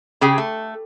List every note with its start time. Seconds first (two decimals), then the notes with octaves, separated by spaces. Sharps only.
0.21 C#3 G4 G#4 G5
0.38 A3